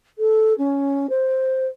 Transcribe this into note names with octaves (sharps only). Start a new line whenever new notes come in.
A4
C#4
C5